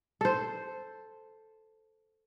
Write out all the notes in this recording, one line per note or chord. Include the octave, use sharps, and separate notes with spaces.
A4 C5